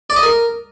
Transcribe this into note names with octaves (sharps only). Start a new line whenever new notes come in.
D5
D#5
A#4